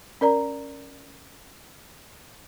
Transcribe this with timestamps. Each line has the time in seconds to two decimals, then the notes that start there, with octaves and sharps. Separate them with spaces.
0.21 C#4 A#4 D5 A#5